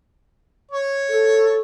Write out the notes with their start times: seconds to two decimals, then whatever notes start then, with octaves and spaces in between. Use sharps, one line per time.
0.72 C#5
1.09 A4